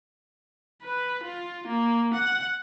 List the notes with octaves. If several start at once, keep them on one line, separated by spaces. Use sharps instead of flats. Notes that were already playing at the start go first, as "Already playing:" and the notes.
B4
F4
A#3
F#5